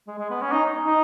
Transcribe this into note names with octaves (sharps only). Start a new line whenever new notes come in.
G#3
G#3
B3
C#4
D#4
D#4